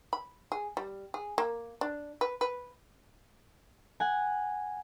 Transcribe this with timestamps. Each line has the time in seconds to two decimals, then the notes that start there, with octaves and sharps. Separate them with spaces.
0.13 B5
0.52 G#4
0.77 G3
1.14 G#4
1.38 A#3
1.81 D4
2.21 B4
2.41 B4
4.00 F#5 G#5